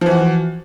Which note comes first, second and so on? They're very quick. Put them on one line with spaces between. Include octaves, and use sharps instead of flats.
F3 E3 F#4